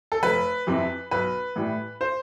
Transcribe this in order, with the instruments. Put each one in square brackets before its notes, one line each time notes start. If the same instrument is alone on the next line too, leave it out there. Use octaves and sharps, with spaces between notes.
[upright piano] A4
F1 B4
F2 C3 E3
B1 B4
A2 E3 G3
C5